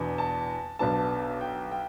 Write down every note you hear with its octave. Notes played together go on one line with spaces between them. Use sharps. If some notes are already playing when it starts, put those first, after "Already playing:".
Already playing: E2 B2 B3 D4
A5
B1 B2 B3 D4 A5
G5
G5